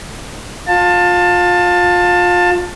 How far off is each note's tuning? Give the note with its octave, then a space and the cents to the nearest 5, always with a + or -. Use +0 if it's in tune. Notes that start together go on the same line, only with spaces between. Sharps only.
F4 +25 A5 +15